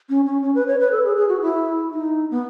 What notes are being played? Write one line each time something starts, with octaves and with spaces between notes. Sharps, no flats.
C#4
C#4
C#4
B4
C#5
B4
A4
G#4
G#4
F#4
E4
D#4
B3